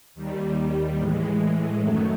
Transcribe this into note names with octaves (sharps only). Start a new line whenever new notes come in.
D#2 D#3 G3
A2 E3 G#3
F#2 D#3 F#3 A3